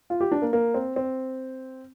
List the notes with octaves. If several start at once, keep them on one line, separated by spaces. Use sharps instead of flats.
F4
G4
D4
A#3
A#3
C4
C4